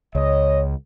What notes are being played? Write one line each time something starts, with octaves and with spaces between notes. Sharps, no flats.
C#2 C#5 D#5